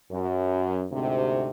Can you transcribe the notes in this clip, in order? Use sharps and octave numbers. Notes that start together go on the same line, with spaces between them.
F#2
D2 G#2 C3